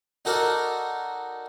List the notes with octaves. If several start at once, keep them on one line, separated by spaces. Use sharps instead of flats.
D#4 F#4 A4 A#4 D5